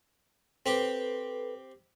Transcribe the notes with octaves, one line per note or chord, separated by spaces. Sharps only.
C4 G4 A4 B4